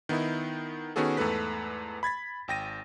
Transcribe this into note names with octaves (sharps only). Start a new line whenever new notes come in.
D#3 B3 D#4 E4
D#3 B3 C#4 F#4 G#4 A4
E2 G#2 A3 A4 B4 B6
B5 G#6 A6 B6
G#1 G5 A#6 D#7